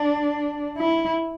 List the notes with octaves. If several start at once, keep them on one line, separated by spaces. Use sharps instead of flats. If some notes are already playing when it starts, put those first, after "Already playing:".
Already playing: D4
E4